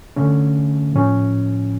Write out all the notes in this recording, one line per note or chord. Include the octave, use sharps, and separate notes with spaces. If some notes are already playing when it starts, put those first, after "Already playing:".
D3 A3 C#4
A2 F3 C#4